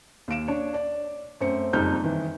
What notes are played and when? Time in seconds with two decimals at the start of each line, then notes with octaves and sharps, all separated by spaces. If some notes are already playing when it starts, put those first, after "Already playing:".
0.28 D#2 F5 D7 E7
0.48 D4 C#5
0.74 D5
1.41 F#2 A3 C4 C#7
1.73 F#1 F2 G3 D#4 F6 G6
2.04 D#3 E3